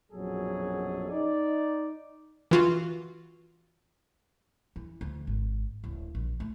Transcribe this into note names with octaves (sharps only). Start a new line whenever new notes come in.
A#1 F#2 B2 F#3 G#4 A4
D#4 D5
E3 F4 F#4
E3
D2
G#1
D1
A#1
A3